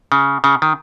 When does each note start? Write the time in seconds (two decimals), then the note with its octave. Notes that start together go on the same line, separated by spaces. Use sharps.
0.12 C#3
0.44 C#3
0.62 D#3